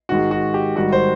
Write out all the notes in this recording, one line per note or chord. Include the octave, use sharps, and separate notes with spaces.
G#2 D#3 G#3 F#4
F#4
G4
G#2 D#3 G3 F#4
C5